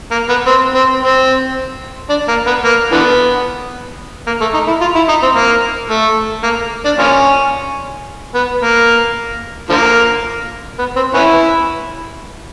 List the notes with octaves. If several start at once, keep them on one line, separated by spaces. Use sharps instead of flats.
A#3
B3
C4
C4
C4
D4
A#3
B3
A#3
D3 E3 B3
A#3
A3
D#4
E4
F4
E4
D#4
C4
A#3
A3
A#3
D4
F3 A#3 C#4
B3
A#3
D3 F3 A#3
B3
C4
B3 C#4 E4